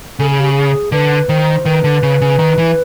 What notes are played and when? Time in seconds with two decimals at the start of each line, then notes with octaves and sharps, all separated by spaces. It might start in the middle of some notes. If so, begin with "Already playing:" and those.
0.19 C#3 A4
0.30 G#4
0.40 G4
0.51 G#4
0.92 D3 B4
1.29 D#3 C5
1.65 D#3 B4
1.84 D3
2.03 C#3
2.21 C#3
2.39 D#3
2.58 E3